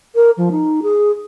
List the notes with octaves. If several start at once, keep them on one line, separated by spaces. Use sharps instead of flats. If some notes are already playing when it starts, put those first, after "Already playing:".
A#4
F3
D#4
G#4